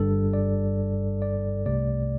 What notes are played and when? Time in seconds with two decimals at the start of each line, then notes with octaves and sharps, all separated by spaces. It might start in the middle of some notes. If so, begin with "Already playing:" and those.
Already playing: G1 G2 G3 A4
0.33 D5
1.22 D5
1.66 C2 C3 A3 D5